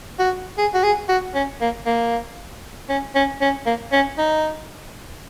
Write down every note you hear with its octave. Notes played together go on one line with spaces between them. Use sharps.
F#4
G#4
F#4
G#4
F#4
C#4
A#3
A#3
C#4
C#4
C#4
A#3
C#4
D#4